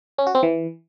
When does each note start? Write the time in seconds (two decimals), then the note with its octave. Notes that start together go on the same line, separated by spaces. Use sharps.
0.18 C#4
0.27 F#4
0.35 C4
0.43 E3